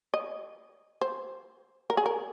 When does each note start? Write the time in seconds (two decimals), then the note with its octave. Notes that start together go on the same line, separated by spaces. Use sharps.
0.14 D#5
1.01 C5
1.90 A#4
1.97 G#4
2.06 A#4